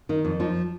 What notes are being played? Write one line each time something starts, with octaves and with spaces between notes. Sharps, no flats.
D#3 D#4
F2
F3 D#4